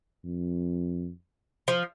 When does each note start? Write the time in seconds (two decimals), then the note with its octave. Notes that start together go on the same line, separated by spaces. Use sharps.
0.25 F2
1.68 F3